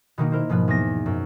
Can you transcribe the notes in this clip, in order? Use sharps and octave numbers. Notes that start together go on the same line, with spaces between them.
B2 D#3 A#3 D#4
E4 A#4 C5
G#2 B2 F3 B3 B4
E2 B3 A#6
F#2